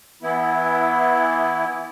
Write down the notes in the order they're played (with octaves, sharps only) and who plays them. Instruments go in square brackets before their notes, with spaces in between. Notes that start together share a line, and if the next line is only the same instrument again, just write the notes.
[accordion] E3 B3 E4